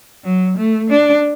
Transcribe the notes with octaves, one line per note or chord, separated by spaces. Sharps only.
F#3
A3
D4